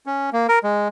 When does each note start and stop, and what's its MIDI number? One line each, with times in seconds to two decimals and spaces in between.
0.06 0.30 61
0.33 0.47 58
0.49 0.59 70
0.63 0.88 56